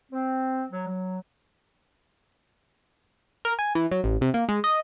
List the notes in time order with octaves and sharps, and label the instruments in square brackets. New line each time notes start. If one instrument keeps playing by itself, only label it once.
[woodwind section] C4
F#3
F#3
[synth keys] A#4
G#5
E3
F#3
A1
C3
A#3
G#3
D#5